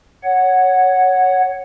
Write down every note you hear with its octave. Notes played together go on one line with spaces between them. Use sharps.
C#5 F#5